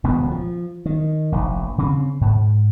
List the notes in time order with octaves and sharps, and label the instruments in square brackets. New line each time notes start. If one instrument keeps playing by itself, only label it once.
[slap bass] D#1 C#2 F#2 B3
F3
D#3
F1 A#1
C#3 C4
G#2